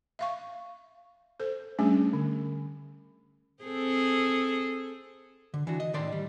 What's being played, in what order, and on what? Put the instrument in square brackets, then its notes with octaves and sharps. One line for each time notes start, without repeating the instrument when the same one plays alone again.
[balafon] E5 F5 C#6
A4 C5
G3 A3 C#4 D4 G#4
D3
[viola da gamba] C4 G#4 A4
[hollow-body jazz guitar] D3
E3 D4 F#4
D#5
A2 D#3 D5 C6
G3